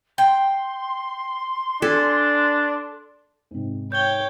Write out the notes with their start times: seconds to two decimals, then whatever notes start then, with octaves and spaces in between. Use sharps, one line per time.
0.18 G5 C6
1.82 D4 A4 G#5
3.51 G#2 C3
3.92 C#5 G5 G6 G7